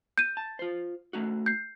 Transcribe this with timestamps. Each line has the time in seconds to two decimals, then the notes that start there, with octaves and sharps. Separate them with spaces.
0.18 G6 D#7
0.37 A5
0.59 F4 C5
1.13 A3 D#4 F#4
1.46 G6 C7